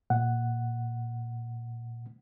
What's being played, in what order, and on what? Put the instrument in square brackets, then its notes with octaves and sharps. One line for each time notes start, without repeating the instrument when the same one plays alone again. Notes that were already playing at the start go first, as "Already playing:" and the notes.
[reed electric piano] A#2 F#5